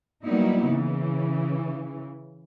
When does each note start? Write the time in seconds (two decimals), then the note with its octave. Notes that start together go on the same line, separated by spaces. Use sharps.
0.24 F#3 G3 A#3 B3 D#4 E4
0.67 C#3 E3